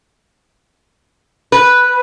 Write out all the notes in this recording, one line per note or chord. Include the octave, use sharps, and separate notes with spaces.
B4